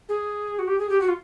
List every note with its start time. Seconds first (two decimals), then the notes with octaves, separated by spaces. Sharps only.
0.09 G#4
0.59 F#4
0.67 G4
0.79 G#4
0.89 G4
1.01 F#4
1.08 F4